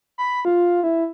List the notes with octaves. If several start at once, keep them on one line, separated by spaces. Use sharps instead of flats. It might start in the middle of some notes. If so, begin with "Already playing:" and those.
B5
F4
E4